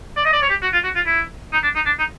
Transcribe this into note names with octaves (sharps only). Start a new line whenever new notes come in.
D5
D#5
D5
C#5
G4
F#4
F4
F#4
F4
E4
D#4
D4
D#4
D4
D#4